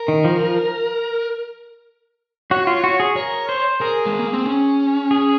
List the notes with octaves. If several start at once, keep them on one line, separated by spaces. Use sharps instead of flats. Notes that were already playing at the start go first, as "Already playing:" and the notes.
Already playing: A#4
D#3
F3
F3
F#4 C#5
F4
F#4
G#4
A#4 C#5
C5
G#4 A#4
G#3
A#3
C4
C#4
G#4